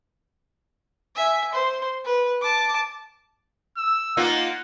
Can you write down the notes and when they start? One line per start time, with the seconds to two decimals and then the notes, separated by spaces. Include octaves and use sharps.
1.16 E5 G#5
1.53 C5 C6
2.05 B4
2.42 A5 D6
3.77 E6
4.17 A#3 D#4 F4 F#5